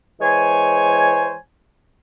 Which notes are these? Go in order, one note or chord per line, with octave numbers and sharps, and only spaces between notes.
E3 G#3 C5 C#5 G#5